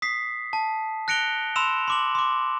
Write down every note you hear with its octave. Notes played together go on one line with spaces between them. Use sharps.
D#6 B6 C7
A5
F#6 A#6 C#7 D7 F7 G7
B5 C6 E6 E7 F7
C6 D6 F#7
C6 D6